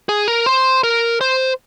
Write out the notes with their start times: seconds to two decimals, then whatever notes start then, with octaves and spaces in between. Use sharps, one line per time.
0.09 G#4
0.28 A#4
0.46 C5
0.84 A#4
1.21 C5